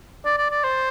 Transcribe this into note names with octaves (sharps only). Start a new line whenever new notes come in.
D5
D5
D5
C5